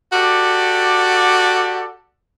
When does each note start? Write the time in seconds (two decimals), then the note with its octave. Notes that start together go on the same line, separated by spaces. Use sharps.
0.13 F#4 G4 A4 D5